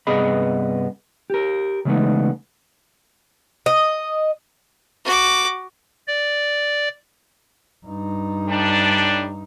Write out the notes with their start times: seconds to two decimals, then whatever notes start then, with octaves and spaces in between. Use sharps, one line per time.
0.07 G2 C3 B3 G#4 D#5 B5
1.30 G4 A#4
1.85 C#3 E3 G#3 A3 B3 D#4
3.66 D#5
5.05 F#4 D6
6.08 D5
7.86 G2 D#4
8.48 A2 G3 D4